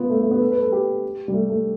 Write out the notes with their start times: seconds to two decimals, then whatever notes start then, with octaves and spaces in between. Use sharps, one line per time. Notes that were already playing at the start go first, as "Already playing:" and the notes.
Already playing: B3 F4
0.10 A3
0.20 A3
0.31 B3
0.41 A4
0.51 B4
0.61 A4
0.72 G4
1.28 G3
1.33 A3
1.49 A3